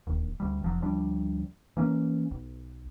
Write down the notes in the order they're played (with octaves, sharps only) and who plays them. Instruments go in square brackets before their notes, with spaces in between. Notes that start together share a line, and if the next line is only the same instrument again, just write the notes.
[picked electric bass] D1 D#2
D2 G3
F1 F3 F#3
D2 F3 G3 D4
E3 A#3 C#4
B1